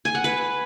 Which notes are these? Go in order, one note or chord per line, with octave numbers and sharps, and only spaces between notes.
G#5
F#5
B4